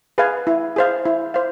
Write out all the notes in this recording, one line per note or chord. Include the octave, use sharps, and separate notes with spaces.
G#4 B4 F5 G#5
E4
G#4 C5 F5
E4
C5 F5